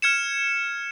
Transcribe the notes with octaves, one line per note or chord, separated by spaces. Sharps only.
F6 G#6 C#7 E7